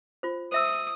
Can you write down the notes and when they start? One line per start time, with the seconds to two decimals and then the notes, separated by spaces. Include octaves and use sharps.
0.23 F4 C5
0.52 C5 E5 D#6 E6